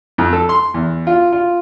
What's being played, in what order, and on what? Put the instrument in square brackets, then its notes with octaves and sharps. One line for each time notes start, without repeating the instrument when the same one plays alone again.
[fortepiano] F2
A4
C6
E2
F4
F4